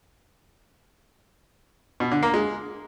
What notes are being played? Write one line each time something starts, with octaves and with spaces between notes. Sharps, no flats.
B2
D3
A#3
G#3